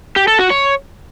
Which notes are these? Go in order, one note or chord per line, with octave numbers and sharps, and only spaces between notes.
G4
A4
F#4
C#5